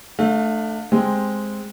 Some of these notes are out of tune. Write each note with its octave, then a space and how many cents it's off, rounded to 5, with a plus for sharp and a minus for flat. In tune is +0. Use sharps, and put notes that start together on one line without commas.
A3 +0 D4 +30 F5 +30
G#3 +0 C4 +0 G4 +0